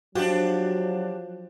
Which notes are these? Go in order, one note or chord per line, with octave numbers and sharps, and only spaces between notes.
F3 F#3 D4 F#4 G4